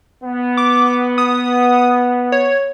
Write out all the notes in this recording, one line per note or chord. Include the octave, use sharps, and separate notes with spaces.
B3
D6
D#6
C#5